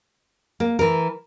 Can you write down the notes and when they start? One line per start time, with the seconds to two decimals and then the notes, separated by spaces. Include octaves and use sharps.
0.60 A#3
0.79 E3 A#4